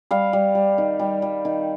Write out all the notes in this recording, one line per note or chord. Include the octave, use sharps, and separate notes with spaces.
G3 F5
G3
G3
D#3
G3
G3
D#3